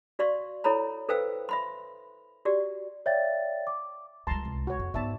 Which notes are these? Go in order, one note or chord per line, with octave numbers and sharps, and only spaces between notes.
F#4 D5 F5 C6 C#6
E4 A4 C#5 A#5 B5
A4 B4 C5 F5 G5 E6
E5 B5 C6
F#4 G4 D5
C#5 D5 E5 F5 G5 A6
D6
C#2 D3 G3 A5 A#5 C6
C2
F#4 C#5
F2 C4
G#2 B3 D#4 D5 E5 A5